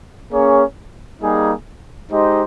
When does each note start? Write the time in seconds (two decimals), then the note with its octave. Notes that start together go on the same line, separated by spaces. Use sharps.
0.32 A#3 C#4 G#4 C#5
1.22 G3 A#3 D#4 G#4
2.11 G#3 D#4 G4 C5 D#5